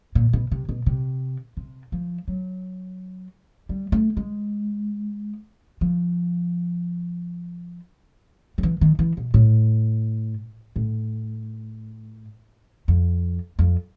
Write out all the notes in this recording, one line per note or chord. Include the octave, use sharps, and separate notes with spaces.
A#2
B2
C3
B2
C3
C3
F3
F#3
G3
A3
G#3
F3
F3
E3
D#3
E3
B2
A2
A2
F2
F2